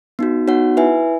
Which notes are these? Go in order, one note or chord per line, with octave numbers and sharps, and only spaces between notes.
B3 D#4 F#4
B3 D#4 F#4 C#5 F#5
E4 B4 E5 G#5